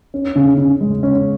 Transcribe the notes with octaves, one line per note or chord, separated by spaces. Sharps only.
C#4
C#3
C#3
G#3
C#4